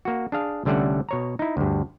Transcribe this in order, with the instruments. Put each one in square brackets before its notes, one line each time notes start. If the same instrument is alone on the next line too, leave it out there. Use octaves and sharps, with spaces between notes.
[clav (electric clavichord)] A#3 F#4
D4 G#4 F5
C2 D3 G3 A3 C#4 F#5
B2 C#5 A#5
D#4 E4
D2 G2